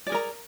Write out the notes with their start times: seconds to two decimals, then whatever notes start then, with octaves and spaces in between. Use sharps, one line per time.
0.07 D5
0.09 G#4
0.12 A#4
0.15 A#5